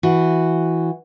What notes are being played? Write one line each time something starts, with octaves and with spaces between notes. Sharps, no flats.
E3 F#4